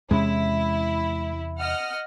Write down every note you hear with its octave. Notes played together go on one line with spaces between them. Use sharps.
E2 C3 G#3 C#4 E4
D#5 F#5 F6